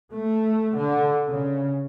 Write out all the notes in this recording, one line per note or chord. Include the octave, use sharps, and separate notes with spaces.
A3
D3
C#3